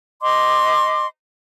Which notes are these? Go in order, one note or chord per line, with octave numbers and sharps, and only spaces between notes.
D#5 C6 D6